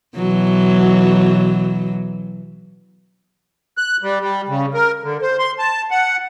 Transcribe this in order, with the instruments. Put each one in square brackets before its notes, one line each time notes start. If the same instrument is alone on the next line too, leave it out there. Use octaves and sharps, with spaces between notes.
[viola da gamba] B2 E3 F#3
[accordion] F#6
G3
G3
C#3
A#4
D3
C5
C6
A5
F#5